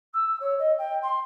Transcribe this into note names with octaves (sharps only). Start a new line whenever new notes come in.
E6
C#5
D#5
G5
C6